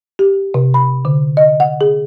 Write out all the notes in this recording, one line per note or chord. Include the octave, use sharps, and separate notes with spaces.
G4
C3
B5
D3
D#5
F#5
G#4